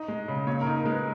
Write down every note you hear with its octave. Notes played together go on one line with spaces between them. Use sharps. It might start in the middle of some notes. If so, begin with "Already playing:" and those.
Already playing: D#4 D#5
G#3
C#3
A#2 C#5
A#4
D#4
A#4
G#3 B4